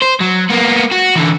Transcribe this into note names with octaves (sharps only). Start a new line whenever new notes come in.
C5
F#3
A#3 B3
F#4
D3 E3